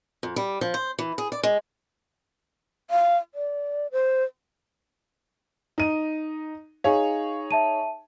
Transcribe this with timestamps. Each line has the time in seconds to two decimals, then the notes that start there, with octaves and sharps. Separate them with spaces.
0.23 F2
0.36 G3
0.61 F3
0.74 C5
0.99 E3
1.18 G#4
1.32 D5
1.43 G#3
2.91 F5
3.35 D5
3.92 C5
5.78 D#4 D#7
6.84 D#4 G#4 C#5 F5
7.51 E5 A5 D#7